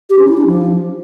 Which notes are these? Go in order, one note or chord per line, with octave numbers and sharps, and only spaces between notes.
G4
C#4
E4
D4
F3